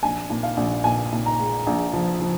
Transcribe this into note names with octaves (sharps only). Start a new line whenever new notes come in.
A#1 G#5
A#2
F5
A#1
A#2 G#5
A#2
A#5
G#3
A#1
F3
F3